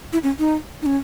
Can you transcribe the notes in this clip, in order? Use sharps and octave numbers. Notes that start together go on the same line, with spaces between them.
E4
C#4
D#4
D#4
C#4